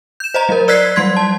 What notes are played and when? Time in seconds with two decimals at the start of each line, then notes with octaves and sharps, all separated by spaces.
0.20 G6 E7
0.34 C5 D#5 A#5
0.49 F#3 A#4
0.68 D5 E6 F#6 G#6 B6 C7
0.96 F#3 G3 C6 G#6
1.16 A5